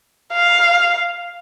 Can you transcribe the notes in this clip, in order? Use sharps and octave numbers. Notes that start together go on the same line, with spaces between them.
F5